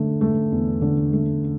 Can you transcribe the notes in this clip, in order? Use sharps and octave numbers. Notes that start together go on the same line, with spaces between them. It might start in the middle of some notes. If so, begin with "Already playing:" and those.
Already playing: D3 A3
A3
E2
D3
A3